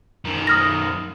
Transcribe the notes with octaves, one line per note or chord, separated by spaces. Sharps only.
F#2 D#3
D#6 F6 A#6